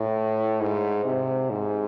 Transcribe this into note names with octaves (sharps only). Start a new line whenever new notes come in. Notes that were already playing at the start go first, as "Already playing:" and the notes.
Already playing: A2
G#2
C3
G#2